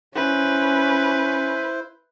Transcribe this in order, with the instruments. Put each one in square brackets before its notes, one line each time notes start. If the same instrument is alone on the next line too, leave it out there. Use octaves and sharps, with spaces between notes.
[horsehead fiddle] C#4 [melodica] E4 C5 [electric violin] B4